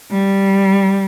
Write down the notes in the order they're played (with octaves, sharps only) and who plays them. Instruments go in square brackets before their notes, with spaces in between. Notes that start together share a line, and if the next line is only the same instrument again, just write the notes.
[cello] G3